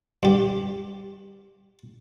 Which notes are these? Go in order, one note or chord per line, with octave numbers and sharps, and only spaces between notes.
G2 G4